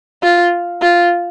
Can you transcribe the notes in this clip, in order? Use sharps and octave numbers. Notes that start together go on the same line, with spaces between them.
F4
F4